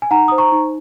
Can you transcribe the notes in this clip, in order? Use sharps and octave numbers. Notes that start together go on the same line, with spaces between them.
G#5
D#4 F#5 A#5
C5 D#6
A#5 C#6
D#4